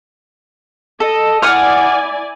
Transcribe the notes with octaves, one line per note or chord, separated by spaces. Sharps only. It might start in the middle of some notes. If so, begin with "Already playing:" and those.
A4 D#5
E4 D5 F#5 G#5 D#6 F6